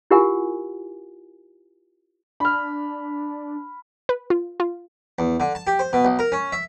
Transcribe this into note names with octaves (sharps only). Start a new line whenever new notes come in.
E4 F4 G4 A#4 F#5 G#5
D4 B5 F6
B4
F4
F4
E2
D3
A5
G4
C5
B2
B1
A#4
C#4
E5